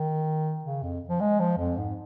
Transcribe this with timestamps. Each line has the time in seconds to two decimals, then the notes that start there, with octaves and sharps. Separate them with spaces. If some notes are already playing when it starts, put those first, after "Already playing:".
Already playing: D#3
0.64 C#3
0.83 F2
1.09 F3
1.20 G#3
1.39 F3
1.58 F2
1.77 G#2